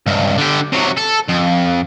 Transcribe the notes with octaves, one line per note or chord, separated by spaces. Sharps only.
C#2 G2
D3 G4
C3 F#3
A4
F2